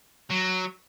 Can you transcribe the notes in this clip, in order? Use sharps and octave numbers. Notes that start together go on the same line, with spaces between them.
F#3